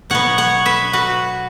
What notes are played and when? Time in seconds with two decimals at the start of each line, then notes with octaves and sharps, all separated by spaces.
0.10 B2 F#3 B3 C#5 F#5
0.38 C#5 F#5
0.66 B4 E5
0.93 F#4 B4